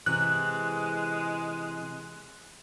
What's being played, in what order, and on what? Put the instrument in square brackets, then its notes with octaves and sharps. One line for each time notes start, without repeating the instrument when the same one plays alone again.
[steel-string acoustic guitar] C3 E3 [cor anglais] G#3 [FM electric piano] F#6